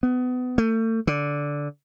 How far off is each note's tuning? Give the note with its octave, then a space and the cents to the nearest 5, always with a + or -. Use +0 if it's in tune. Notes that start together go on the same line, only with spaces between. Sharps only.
B3 +25
A3 +35
D3 -10